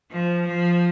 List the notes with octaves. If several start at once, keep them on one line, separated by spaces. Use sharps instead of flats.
F3
F3